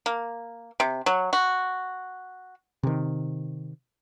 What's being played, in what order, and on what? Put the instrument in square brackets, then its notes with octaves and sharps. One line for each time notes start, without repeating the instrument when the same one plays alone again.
[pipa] A#3
C3
F#3
F#4
[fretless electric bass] C3 D#3